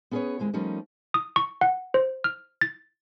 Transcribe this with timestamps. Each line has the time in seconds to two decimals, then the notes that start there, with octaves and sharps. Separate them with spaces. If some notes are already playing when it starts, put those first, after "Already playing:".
0.11 B3 C#4 G#4 A4 B4 C#5
0.39 D#2 A#2 G#3 C4 E4
0.53 F3 G3 A3 A#3 C#4 D#4
1.14 D#6
1.36 C#6
1.61 F#5
1.94 C5
2.24 F6
2.61 A6